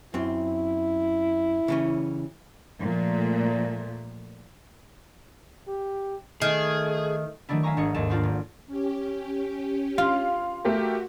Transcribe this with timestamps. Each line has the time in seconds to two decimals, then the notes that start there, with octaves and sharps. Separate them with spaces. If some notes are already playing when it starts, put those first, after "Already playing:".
0.14 F#2 C4 E4
1.68 C#3 E3 C#4
2.82 A#2 F3 A3
5.68 G4
6.42 D#3 A3 G#4
7.49 D#3 F#3 A3 D4 E4
7.63 E5 F5 G#5 A#5 C#6
7.77 G#1 G#3 D4 G#4 C#7
7.94 D#2 G#2 A4 E7
8.09 A#3 D4 F4 F#4 C5
8.23 G#1
8.67 C#4 G4
9.98 F4 F5
10.65 A3 F#4 G4 A#4